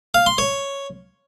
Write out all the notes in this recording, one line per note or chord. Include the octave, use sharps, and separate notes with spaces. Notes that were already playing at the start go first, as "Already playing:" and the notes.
F5
C6
C#5